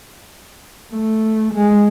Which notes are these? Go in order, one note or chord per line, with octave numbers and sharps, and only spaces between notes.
A3
G#3